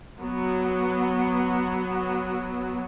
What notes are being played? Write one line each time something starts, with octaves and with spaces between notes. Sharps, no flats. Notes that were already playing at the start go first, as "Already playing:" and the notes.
F#3 B3